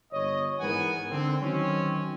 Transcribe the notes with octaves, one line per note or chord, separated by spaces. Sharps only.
G1 C#5 D#5
G#2 E3 B3 A#4 F#5 G#5
D3 C4
D#3 F#3 C4 C#4